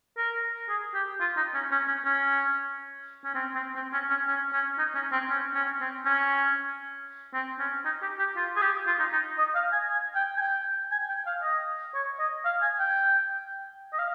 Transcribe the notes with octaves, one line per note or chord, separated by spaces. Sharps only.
A#4
G#4
G4
F4
D#4
C#4
C#4
C#4
C#4
C#4
C4
C4
C4
C#4
C#4
C#4
C#4
D#4
C#4
C4
C#4
C#4
C4
C#4
C4
C#4
D#4
G4
G4
F4
G#4
G4
F4
D#4
D#4
D#5
F5
G#5
G#5
G5
G#5
G5
G#5
G5
F5
D#5
C#5
D#5
F5
G#5
G5
D#5
F5